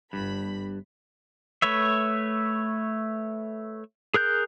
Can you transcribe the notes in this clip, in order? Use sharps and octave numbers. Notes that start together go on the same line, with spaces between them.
G1 G2 B5
A3 B4 C#5 E5
G#4 A#4 F#6 G6